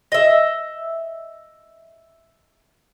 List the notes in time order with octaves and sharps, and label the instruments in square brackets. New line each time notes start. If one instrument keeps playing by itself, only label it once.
[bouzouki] D#5 E5